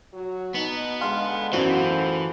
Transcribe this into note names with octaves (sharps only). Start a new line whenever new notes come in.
F#3 F#4
B2 B3 D#4
D3 G#3 F5 C6
F#2 A2 E3 F4 F#4 A4 C5